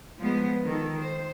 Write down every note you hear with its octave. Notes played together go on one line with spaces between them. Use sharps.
F3 G#3 B3
D#3 A4
C5